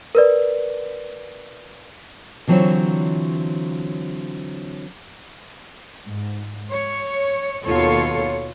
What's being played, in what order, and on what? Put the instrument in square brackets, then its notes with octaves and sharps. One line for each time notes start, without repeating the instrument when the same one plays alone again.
[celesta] A#4 B4 D5
[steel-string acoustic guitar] D3 E3 F#3 C4 F4 C#5
[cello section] G#2
C#5
D#2 B2 F4 A4 C#5